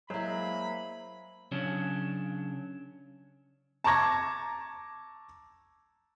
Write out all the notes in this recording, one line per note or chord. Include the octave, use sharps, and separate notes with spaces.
F#3 G#3 A#3 E4 C5 B5
C#3 F#3 C#4 D4
A5 A#5 C#6 D6 G#6 A#6